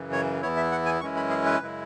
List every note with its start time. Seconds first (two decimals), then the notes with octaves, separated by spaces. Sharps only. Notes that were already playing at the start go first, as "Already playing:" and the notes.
Already playing: F#2 C#3 E3
0.12 C#5
0.42 E2 E3 B3 E4 C#5
0.57 E5
0.72 F#5
0.86 G#5
1.01 F#2 E3 G#3 C#4 E4 C#6
1.16 B5
1.30 G#4
1.45 B4
1.60 F#2 C#3 G#3 E4